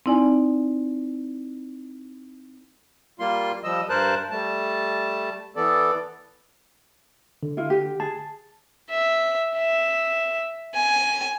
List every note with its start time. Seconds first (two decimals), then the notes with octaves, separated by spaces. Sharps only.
0.06 C4 D#4 E4 D5 G#5
3.20 G3 A#3 F4 C6
3.64 F3 G3 D#5 E6
3.89 G2 A#4 C5 A5 F#6
4.31 G3 A3 A5
5.56 E3 B3 A4 D5
7.43 D3
7.57 E4 F4
7.70 G4
8.00 G#4 A5
8.90 E5
9.57 E5
10.74 G#5